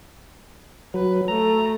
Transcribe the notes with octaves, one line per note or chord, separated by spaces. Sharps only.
F#3 B4
A3 A#5